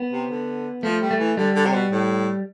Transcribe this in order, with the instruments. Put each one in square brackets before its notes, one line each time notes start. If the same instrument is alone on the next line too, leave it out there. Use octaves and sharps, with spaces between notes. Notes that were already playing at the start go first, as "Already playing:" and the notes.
Already playing: [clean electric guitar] B3
[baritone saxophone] C3
D3
[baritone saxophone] F3 [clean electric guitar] A3
[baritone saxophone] G3
[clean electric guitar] A3
[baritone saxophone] E3
[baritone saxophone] D3 [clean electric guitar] G3
[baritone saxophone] D3
C3
B2
A2